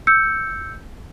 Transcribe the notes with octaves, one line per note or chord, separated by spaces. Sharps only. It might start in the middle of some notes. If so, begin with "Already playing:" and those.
E6 G6 C#7